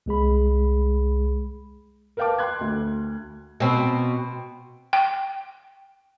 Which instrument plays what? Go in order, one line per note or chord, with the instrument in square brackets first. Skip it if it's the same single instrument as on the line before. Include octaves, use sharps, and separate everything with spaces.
[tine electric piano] C2 G#3 G#4 B5
[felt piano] A#4 B4 F5 G5 A5 D6
G5 C6 F#6 G#6
D2
[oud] B2 C4
[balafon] G5